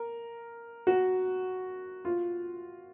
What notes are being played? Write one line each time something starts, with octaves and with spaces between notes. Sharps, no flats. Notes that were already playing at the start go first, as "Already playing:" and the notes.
Already playing: A#4
F#4
F4